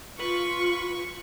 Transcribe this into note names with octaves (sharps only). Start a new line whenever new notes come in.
F4 B4 C#6